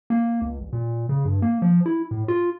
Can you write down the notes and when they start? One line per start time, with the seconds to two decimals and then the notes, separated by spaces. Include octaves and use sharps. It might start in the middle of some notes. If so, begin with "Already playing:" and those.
0.10 A#3
0.42 C#2
0.61 A1
0.73 A#2
1.09 C#3
1.25 G2
1.42 A#3
1.62 F3
1.86 E4
2.11 A2
2.28 F4